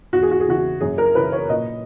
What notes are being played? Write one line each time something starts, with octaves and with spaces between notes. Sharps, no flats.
E2 F#4
G#4
F#4
G#4
C#3 E3 F#4
F#2 G#4
A#4
C#3 E3 B4
C#5
A#2 D#5